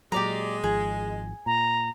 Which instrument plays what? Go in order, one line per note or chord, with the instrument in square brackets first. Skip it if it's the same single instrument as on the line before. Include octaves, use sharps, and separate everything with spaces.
[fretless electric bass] A#2 F#3 [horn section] G#3 [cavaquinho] G4 D5 A#5
[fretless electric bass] G#1 F3 [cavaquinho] G#4
[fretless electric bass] A#2 [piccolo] A#5